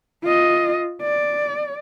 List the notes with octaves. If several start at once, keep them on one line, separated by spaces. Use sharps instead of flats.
F4 D#5
D5